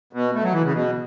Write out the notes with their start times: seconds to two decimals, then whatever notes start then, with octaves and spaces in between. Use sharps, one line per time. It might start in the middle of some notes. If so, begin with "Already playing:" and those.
0.13 B2
0.34 A3
0.43 F#3
0.53 E3
0.63 C#3
0.73 B2